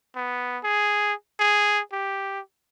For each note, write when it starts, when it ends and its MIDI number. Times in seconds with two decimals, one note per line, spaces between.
0.16 0.58 59
0.64 1.13 68
1.40 1.80 68
1.92 2.39 67